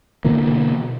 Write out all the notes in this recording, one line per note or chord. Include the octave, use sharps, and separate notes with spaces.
B2 D3 E3 A#3